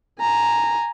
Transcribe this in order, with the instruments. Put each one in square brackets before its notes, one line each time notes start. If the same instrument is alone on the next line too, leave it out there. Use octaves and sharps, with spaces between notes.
[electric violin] G#5 A#5